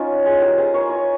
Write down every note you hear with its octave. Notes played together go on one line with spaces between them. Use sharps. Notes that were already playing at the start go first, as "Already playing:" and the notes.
Already playing: C#4 D#4 F4
F4 G#4
G4 A#4
G#4 C5
A#4 C#5
A#4 C#5